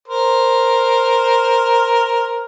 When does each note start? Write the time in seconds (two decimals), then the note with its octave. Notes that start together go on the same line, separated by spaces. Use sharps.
0.08 A#4 C5